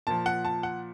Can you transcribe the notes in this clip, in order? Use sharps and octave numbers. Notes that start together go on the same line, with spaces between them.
A#2 F3 A5
F#5
A5
F#5